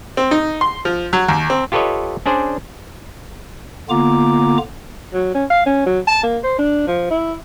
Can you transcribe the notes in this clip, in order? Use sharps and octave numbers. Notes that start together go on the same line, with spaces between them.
C4
D#4
C6
F3
F#3
D#2
C4
F4 G4 A4 B4 C#5 D#5
C#4 D4 G#4 C5 D5
D3 A#3 B3 F4 A#5 D6
F#3
C#4
F5
C#4
F#3
A5
A#3
C5
D4
F3
E4